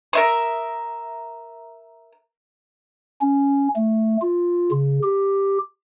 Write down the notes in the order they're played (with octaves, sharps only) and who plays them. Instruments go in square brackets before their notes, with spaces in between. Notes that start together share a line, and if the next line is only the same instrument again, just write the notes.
[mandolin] A#4 E5 D#6
[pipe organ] C#4
A3
F4
C#3
G4